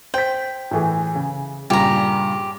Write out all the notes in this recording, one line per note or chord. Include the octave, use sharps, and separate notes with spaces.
C5 G5 B6
A2 E3 G#4
C#3
G2 A#2 C#3 G4 A#5